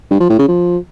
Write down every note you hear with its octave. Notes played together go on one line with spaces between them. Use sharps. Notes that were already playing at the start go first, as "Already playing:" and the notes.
G2
F3
A2
C#3
F3